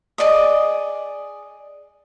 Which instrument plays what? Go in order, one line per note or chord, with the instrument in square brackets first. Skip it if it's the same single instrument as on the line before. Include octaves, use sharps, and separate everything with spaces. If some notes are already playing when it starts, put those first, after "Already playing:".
[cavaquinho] G#4 D5 D#5 D#6